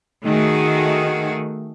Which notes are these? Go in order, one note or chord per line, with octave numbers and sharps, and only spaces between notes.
D#3 A3 F#4 G#4